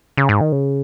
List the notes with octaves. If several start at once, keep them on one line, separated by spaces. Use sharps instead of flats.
C#3
G#2
D#3
C#3